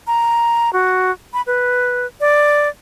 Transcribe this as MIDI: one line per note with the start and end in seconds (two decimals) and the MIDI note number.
0.07 0.72 82
0.73 1.11 66
1.33 1.41 83
1.47 2.06 71
2.20 2.68 74